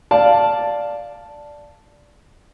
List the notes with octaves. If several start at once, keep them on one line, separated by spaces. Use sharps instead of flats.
D5 F5 A5